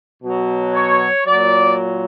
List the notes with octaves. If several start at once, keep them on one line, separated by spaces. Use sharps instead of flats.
B2 F#3
C#5
A#2 F#3 D5